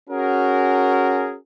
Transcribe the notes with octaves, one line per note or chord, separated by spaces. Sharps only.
C#4 F#4 G#4 A#4